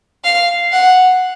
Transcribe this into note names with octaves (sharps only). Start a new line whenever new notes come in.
F5
F#5